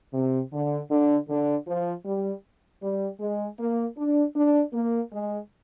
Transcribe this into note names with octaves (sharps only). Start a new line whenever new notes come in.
C3
D3
D3
D3
F3
G3
G3
G#3
A#3
D4
D4
A#3
G#3